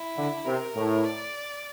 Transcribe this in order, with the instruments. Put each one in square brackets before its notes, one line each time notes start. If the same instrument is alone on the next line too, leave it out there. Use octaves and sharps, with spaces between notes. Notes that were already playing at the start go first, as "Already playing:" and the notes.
Already playing: [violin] E4
[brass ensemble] D3
[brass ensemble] C3 [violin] A#4
[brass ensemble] A2
[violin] D5